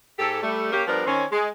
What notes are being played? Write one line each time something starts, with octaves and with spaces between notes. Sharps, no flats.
G#2 G4 A4
G3 A3
A#3 C#4 G4
F3 G3 B3 D4 A#4
D#3 C4 C#4
G#3